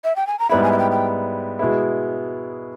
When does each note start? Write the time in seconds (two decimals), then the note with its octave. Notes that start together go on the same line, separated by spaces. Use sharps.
0.04 E5
0.16 G5
0.27 G#5
0.39 A#5
0.49 G#2 G3 B3 E4 B5
0.63 G#5
0.72 E5
0.78 G5
0.91 G5
1.59 B2 G#3 B3 E4